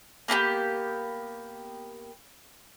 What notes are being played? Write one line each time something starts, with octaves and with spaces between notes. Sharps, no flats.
A#3 B3 F#4 G4